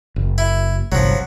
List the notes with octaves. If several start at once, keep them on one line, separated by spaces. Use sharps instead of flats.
F#1
E4
G1 C2 F3 F#3